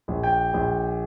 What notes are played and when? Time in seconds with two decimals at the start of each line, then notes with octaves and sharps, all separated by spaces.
0.08 A#1
0.23 G5
0.54 A#1